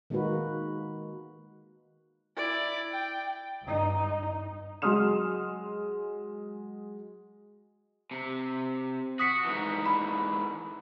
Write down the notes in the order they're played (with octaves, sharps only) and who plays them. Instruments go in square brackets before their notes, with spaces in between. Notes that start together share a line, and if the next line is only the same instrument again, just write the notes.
[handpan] D#3 G#3 A#3 D#4 F#4 B4
[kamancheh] E4 D5
G5
[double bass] G2 D#4
[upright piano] F#3 G#3 C6 D#6 F6 E7
[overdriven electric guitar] C3
[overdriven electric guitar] F#4 [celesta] D#6 B6 C#7
[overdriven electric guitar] G#2 E3
[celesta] B5